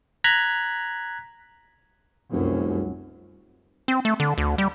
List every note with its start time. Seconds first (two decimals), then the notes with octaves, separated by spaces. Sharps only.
0.24 A#5 F#6 G#6 B6
2.33 F1 C2 F#2
3.88 C4
4.05 A3
4.20 D3
4.38 D2
4.58 G3